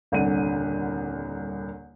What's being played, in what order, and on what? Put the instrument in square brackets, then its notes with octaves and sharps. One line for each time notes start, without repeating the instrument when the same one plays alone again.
[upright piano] D#1 C2 D3 F#5 D#7